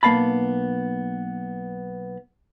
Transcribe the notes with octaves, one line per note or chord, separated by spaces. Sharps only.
B1 A#3 B3 F5 A5 B5